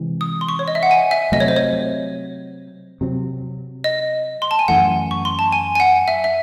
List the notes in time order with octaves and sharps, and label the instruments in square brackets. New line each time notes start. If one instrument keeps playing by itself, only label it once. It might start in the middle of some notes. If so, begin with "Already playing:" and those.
Already playing: [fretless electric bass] C3 E3 G#3 C4
[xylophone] D#6
C6
C#6
C#5
D#5
E5
F#5
G#5
E5
[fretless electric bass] C3 F#3 A3 C4 [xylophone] D#5
[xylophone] C#5
C5
C#5
[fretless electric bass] C3 F#3 C4
[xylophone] D#5
C6
A5
G#5
[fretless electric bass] F#2 E3 A3 [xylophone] F#5
[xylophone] C#6
C6
A5
G#5
G#5
F#5
E5
E5